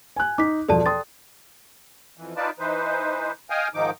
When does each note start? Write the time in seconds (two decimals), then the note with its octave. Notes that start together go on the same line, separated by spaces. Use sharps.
0.16 G#5 F#6
0.38 D#4 D6 B6
0.69 E2 B2 F3 A4 D5 A5
0.86 G5 C6 D#6 A6
2.18 F2 E3
2.36 D#4 F4 B4 D5 A5
2.59 E3 D#4 B4 C5
3.50 D#5 F5 G5 G#5 D#6 F6
3.74 G#2 D#3 F3 D#4 D6